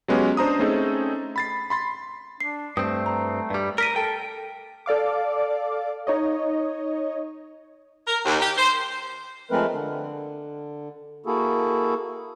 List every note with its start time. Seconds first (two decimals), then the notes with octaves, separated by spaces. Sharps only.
0.08 F#3 G#3 B3 C#4 G4
0.37 D4 C5 A#5 D#6
0.59 A3 C4 C#4 D#4 G#4 A4
1.36 B5 A6 C7
1.70 B5 C6 A6
2.40 D4 C7
2.77 G2 A3 C4 D#6
3.06 A#5
3.50 G2 G3
3.78 A#4 F6 B6 D#7
3.96 A4 G5
4.86 A4 D5 F5 D6
6.07 D#4 C#5 D#5
8.07 A#4
8.25 D#2
8.40 G4
8.57 C5
9.50 F3 G#3 A3 C4 A#4 B4
9.72 D3
11.26 A#3 E4 F#4 G#4 A4